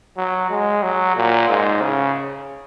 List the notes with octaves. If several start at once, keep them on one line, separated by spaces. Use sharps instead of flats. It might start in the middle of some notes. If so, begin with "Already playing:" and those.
F#3
G#3
F#3
A#2
G#2
C#3